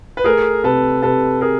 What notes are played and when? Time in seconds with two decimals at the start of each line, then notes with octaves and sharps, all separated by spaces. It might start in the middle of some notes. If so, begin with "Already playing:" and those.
0.17 B4
0.24 A3 G#4 A#4
0.64 C3 A4 B4
1.02 C3 A4 B4
1.41 G#4 A#4